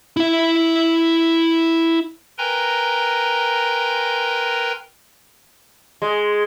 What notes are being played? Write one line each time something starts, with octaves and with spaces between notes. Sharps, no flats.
E4 E5
A#4 B4 G5 G#5 A#5 C6
G#3